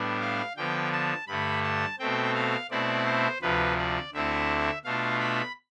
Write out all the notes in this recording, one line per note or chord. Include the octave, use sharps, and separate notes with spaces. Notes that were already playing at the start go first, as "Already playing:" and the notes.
Already playing: A2 G3 B3 D4
F5
D3 F3 B3 G5
A5
G2 D3 A3 B5
A5
B2 A3 C4 G5
F5
B2 A3 C4 E4 D5
C5
D2 C3 F3 B4
D5
D2 D3 A3 C4 E4 E5
B2 A3 D4 F4 F5
B5